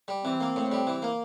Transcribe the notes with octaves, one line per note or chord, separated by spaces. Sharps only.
G3
E3 C4
A#3
A2
G3
E3
A#3